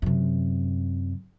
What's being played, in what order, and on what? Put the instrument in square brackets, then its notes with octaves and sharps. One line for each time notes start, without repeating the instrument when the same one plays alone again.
[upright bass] F#2 C3